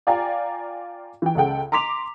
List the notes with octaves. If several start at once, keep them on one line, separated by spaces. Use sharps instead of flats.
F4 D5 F5 G5 G#5 A#5
E3 G5
C#2 C#3 A4 F#5 G5
A#5 C6 D6 B6 F7